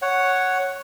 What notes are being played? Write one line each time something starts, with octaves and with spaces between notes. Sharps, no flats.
C#5 F#5